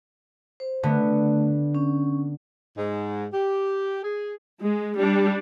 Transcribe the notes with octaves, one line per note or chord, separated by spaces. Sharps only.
C5
D3 A3 B3
C#4
G#2
G4
G#4
G#3
G3 D4